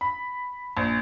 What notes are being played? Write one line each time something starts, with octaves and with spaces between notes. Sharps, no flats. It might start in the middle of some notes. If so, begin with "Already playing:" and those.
B5
A#1